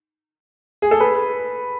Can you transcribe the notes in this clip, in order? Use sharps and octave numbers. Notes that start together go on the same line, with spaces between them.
G#4
A4
B4